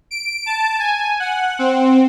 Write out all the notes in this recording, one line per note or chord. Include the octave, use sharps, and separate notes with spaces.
D7
A5
G#5
F#5
C4